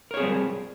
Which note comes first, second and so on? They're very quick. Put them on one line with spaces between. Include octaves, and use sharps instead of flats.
A#4 C#5 G#4 C4 G3